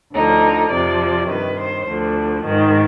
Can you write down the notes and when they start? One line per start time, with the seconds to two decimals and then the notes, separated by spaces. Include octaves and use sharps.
0.14 D2 D3 F3 D#4
0.72 F2 C3 F3 D5
1.30 G2 D#3 B4
1.59 C5
1.88 D2 D3 F3
2.45 G#2 D#3